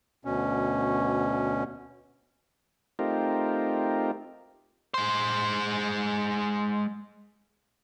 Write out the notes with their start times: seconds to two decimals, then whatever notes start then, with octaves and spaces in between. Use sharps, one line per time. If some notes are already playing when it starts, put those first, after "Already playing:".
0.25 D2 B2 C#4
2.99 A3 C4 D#4 F4 G4 A#4
4.94 G#3 C5